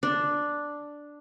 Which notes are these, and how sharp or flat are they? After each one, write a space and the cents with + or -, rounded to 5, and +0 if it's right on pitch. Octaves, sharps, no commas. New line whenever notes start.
D4 +0